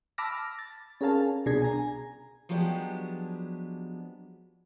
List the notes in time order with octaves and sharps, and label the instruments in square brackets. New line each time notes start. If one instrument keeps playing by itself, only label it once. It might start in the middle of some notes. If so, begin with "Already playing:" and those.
[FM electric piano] A5 B5 D6 E6 F6 A#6
A6
C#4 G#4 A#4 F5 A5
C2 B2 D4 G#4 G#6
G#5 A#5
[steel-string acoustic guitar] F3 F#3 G#3 B3 D4 G4